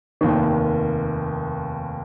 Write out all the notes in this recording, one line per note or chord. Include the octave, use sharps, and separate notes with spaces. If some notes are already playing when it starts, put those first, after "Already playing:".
F1 D#2 D#3